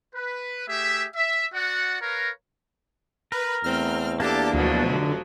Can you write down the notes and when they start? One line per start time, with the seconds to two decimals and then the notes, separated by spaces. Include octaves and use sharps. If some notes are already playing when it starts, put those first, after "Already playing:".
0.15 B4
0.68 A3 G4 G#4 E5
1.15 E5
1.54 F#4 D5 F#5
2.02 A#4 B4 C#5 F5 A#5
3.32 A#4 B4
3.64 E2 A3 C4 F6
4.20 A#3 D4 G4 A4 A5 D6
4.53 D2 B2 F3 F#3
4.90 F1 D3